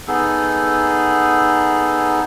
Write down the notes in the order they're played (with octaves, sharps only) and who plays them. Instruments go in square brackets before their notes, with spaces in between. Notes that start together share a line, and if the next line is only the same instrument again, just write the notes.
[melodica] B3 D#4 G#4 A4